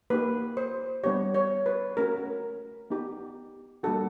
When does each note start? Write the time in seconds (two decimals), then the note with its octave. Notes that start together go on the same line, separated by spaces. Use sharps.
0.10 A#3 D#4 G4 B4
0.57 C5
1.04 G3 B3 D4 G4 C#5
1.34 C#5
1.66 B4
1.97 A3 C#4 F#4 A#4
2.90 B3 D#4 G4
3.83 G3 A#3 D4 F#4 A4